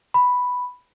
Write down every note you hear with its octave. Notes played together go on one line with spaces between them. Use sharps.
B5